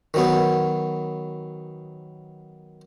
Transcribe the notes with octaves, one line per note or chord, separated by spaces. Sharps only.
D#3 F#3 B3